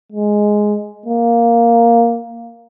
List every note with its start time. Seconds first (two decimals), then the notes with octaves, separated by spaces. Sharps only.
0.12 G#3
1.06 A#3